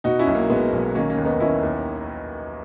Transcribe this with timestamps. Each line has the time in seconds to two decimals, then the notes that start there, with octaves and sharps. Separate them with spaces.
0.04 B2 D#4 F#4
0.19 C#4 E4
0.27 B1
0.35 A#3 C#4
0.49 B2 G#3 B3
0.72 B1
0.95 D#3 A#3 C#4
1.10 A#3 C#4
1.18 D#2
1.25 B3 D#4
1.40 D#3 C#4 E4
1.63 D#2